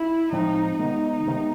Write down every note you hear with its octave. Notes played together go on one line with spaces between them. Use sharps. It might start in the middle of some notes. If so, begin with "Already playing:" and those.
Already playing: E4
A2 F3 G#3 C4 D#4
C3 D#3 G#3 B3 D#4
C3 D#3 G#3 B3